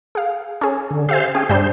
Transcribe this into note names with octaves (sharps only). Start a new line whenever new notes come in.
G#4 F5
C#4 G#4
D3
G4 C5 E5 F5 G#5
C#4 G#4 G5
G2 G3 D4 C5